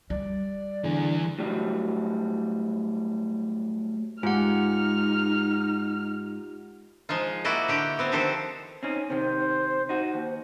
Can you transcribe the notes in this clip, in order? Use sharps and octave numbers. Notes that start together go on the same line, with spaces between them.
G3 D5
D3 E3 G#4
A2 F#3 G3
G#2 D#4 F4 G4 F#5 F6
F3 G#3 D#4 F4
A#3 E4 F#4 D5 D#5
D3 G4 G5
B3 C4
D3 D#3 F3 G4 A4 C5
C4 C#4 D#4
C3 D#3 C5
D#4 F#4
D#2